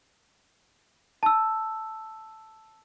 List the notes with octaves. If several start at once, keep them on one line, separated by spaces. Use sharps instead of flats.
A5 E6